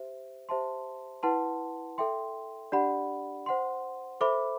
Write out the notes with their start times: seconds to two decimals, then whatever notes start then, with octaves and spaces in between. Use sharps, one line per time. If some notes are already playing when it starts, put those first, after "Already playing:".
Already playing: G4 C5 E5
0.49 G4 C5 E5 A5 C6
1.23 E4 B4 F#5 A5 C6
1.98 A4 E5 G5 C6
2.72 D4 G4 D5 F#5 B5
3.46 C5 F#5 C6
4.21 A4 C5 E5 B5 D6